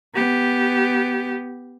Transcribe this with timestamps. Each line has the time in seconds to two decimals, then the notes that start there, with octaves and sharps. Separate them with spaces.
0.13 B3 G4